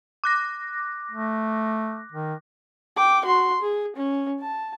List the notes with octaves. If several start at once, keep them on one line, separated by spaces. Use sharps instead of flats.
D6 F#6 A#6
A3
D#3
G5 D6
F#4 C6
G#4
C#4
A5